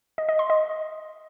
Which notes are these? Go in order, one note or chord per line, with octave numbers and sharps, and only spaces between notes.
D#5
D#5
C6
D#5